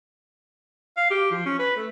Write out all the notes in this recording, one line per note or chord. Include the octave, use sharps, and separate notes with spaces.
F5
G4
F3
C#4
B4
A3